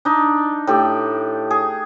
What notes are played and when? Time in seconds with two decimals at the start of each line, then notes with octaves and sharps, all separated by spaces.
0.05 D4 D#4
0.67 A2 G4 A4
1.51 G#4